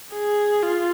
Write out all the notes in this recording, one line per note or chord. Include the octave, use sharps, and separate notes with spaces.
G#4
F4